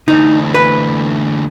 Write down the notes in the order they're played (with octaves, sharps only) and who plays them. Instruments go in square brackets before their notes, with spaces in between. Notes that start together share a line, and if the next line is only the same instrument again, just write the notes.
[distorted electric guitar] D2 E3 [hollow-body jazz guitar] D#4
[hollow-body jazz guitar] B4